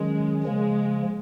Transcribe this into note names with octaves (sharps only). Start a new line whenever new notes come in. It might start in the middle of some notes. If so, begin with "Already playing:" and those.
Already playing: D#3 F#3 G#3 C#4
C#3 F3 G#3 A#3